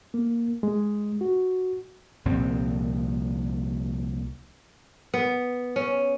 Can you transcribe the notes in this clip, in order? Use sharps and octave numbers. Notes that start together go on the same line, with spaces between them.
A#3
G#3
F#4
C2 A#2 F3 C4
B3
C#4